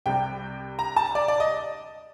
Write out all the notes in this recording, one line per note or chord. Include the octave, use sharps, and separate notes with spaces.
C2 C3 G3 G5
A#5
A5
D5
D5
D#5